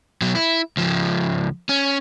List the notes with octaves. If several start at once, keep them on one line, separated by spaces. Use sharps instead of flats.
B2 F#3
E4
C#2 F3
C#4